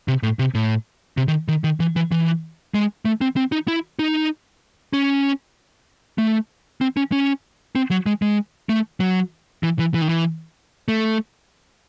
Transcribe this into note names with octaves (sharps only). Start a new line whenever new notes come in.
C3
A2
C3
A2
C3
D#3
D#3
D#3
E3
E3
E3
G#3
A3
C4
C4
D#4
E4
D#4
C#4
A3
C4
C#4
C#4
C4
F#3
G#3
G#3
A3
F#3
E3
E3
E3
D#3
E3
A3